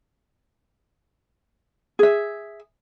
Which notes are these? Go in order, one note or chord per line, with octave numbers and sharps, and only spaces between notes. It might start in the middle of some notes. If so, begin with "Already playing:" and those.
G#4 E5